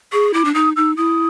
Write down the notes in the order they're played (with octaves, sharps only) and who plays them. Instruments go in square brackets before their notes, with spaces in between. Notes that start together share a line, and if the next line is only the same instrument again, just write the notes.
[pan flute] G#4 [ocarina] C#6
[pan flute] E4 [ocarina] D6
[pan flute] D4
[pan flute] D#4 [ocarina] D#6
[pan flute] D#4 [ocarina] E6
[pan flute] E4 [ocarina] D#6